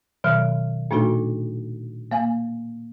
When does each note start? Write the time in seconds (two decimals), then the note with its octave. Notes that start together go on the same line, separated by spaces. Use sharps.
0.24 B2 D#3 F#3 F6
0.91 A#2 A3 D4 D#4 F#4 A4
2.11 A#3 F5 G#5